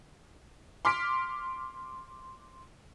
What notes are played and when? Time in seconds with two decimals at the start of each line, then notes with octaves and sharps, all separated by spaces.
0.85 C6 D6 F6 B6 D7